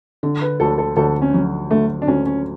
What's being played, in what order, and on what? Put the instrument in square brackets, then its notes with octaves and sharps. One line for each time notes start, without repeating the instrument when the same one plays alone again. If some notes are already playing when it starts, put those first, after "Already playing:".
[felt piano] D3
[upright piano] B4
[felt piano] D2 [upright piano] A4
[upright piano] A4
[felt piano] D2 [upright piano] A4
[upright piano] C#4
[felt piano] F#3
[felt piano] D3 [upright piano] A3
[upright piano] D4
[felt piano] D2 [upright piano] C#4
[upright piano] C#4